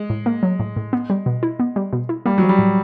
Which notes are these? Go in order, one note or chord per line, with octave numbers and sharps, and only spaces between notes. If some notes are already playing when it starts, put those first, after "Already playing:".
Already playing: G#3
A2
A#3
F#3
A2
A2
B3
G3
B2
E4
B3
G3
B2
E4
G3 A#3
F#3
F3
G3
A2